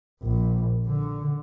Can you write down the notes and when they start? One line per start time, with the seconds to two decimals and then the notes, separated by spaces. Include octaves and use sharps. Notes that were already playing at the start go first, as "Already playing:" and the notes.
0.23 A#1
0.87 D3